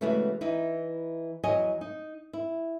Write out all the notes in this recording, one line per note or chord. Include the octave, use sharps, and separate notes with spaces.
C#3 E3 G#3 A3 B3 F#4
E3 D#4 E4
E2 F#3 D#5 G#5
D#4
E4